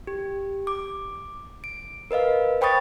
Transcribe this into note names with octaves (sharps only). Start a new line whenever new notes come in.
G4
D6
D7
A#4 B4 D#5 F5
C5 G5 B5 C#6 D#6 A6